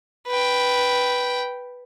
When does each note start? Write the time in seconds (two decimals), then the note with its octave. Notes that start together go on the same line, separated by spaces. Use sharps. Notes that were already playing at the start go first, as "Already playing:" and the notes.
0.28 B4 G5